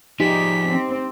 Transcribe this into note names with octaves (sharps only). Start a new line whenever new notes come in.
F3 D#4 G4 G#4 B6
C4